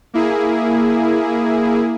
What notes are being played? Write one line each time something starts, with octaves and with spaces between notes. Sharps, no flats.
A#3 E4 G#4